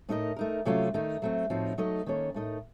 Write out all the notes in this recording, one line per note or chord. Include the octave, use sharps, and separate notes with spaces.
A2 A3 D#4 A#4 D#5
A3 D#4 A#4
C3 F#3 A3 C#4 F4
D#3 A3 D#4
F#3 A3 C4
A2 F3 C4 D#4 F#4
F#3 A3 D#4 A4 D#5
D#3 A#3 C#4 A4 C#5
A2 A3 D#4 A#4